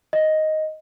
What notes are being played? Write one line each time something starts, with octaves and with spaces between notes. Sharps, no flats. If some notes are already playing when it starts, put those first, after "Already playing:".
D#5